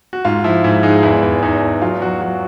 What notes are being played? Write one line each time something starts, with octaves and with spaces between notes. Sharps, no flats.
F#4
G#2 F4
F3 E4
G#2 E4
G#3 D#4
E2 E4
E2
E2 D#4
E2
F#3 F4
F#3 F#4
F#3 F#4